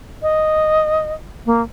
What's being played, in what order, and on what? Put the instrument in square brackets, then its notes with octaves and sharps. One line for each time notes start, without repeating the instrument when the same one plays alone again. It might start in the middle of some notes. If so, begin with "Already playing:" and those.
[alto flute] D#5
A#3